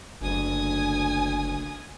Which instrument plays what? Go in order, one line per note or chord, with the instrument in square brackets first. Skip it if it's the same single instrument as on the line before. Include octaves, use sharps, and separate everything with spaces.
[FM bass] F#1 [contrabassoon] D2 [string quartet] G#5 D#6